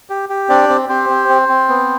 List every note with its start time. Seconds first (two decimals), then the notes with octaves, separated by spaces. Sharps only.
0.10 G4
0.29 G4
0.49 C4 D4 D5
0.69 C4
0.89 C4 G4 C5
1.09 C4
1.29 C4
1.49 C4
1.69 B3